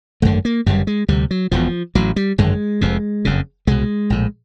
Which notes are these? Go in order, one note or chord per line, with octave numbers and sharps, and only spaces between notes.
G#1 F#2 D3 A3
A#3
G1 F#2 C#3 G3
G#3
D2 C3 G3
F#3
E1 E2 B2 F3
A1 A2 F#3
G3
G#1 F#2 D3 G#3
F1 F2 C3
F#1 F2 C#3
C2 B2 G#3
A#1 A2